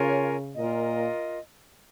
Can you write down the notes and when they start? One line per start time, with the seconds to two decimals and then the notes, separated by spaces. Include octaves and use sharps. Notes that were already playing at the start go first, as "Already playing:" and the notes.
Already playing: C#3 F4 A#4 C#5 G#5
0.56 A#2 F4 A#4 D#5